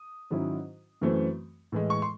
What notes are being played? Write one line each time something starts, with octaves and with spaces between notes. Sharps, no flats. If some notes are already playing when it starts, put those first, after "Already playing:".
Already playing: D#6
G#2 D#3 F#3 C#4 E4
F#2 E3 A3 C4
A2 E3 G#3
C#6
C6